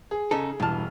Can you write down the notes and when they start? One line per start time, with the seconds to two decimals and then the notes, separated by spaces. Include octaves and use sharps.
0.11 G#4
0.31 C#3 D#4 A4
0.60 E1 G2 E3 A5 F6